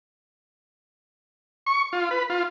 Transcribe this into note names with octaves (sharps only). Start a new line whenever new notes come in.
C#6
F4
B4
F4